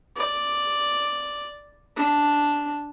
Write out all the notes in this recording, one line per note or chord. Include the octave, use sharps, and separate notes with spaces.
D5
D4